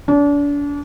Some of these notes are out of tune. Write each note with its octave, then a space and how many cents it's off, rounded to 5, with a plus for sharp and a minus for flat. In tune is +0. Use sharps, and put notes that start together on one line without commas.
D4 -35